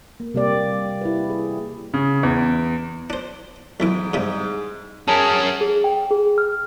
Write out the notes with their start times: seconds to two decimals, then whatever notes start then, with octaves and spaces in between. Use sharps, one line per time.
0.20 A#3
0.34 C3 G3 A#3 G4 D5
1.01 E4 G4 B4
1.30 G#4
1.94 C#3
2.23 E2
3.10 D4 C5
3.80 B1 G#2 E3 D6
4.14 G2 C3 G3
5.08 C#4 G#4 A#4 A5
5.61 G#4
5.84 G5
6.11 G#4
6.38 F6